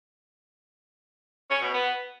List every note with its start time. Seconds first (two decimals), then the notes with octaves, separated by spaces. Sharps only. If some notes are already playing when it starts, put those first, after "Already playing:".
1.50 C#4
1.61 B2
1.72 B3